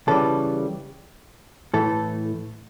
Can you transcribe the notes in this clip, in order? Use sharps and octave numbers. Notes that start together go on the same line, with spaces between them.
C#3 E3 G3 A4
A2 E3 A3 A4